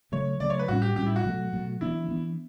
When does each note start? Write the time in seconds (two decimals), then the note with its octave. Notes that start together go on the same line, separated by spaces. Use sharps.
0.12 C#3 F#3 A3 C#5
0.40 C#3 F#3 A3 D5
0.50 C#5
0.59 B4
0.68 A2 G3 C#4 F#4
0.82 G4
0.96 A2 G3 C#4 G4
1.06 E4
1.16 F#4
1.24 B2 F#3 A3
1.53 B2 F#3 A3
1.81 E3 B3 D4 E4
2.09 E3 B3 D4